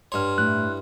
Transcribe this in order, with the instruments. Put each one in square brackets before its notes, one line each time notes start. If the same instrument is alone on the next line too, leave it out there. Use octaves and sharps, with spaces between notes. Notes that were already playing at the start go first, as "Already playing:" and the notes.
[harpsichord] G2 C#5 [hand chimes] C6 F6
[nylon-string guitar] A2 [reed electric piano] F#6